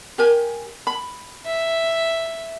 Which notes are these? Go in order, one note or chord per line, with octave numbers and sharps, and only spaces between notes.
G4 A#4 G#5
B5
E5